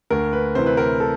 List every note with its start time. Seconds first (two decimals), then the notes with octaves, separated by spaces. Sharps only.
0.10 D2 A#4
0.33 B4
0.55 C3 E3 C5
0.66 B4
0.77 A#4
1.00 A4